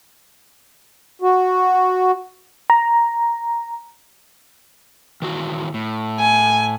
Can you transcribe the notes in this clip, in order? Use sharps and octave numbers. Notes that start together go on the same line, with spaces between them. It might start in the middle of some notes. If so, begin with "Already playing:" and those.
F#4
A#5
D#3 E3 F#4
A2
G#5